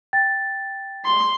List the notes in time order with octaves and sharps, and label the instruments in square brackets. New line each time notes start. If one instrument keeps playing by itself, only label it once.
[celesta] G5 A6
[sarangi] C6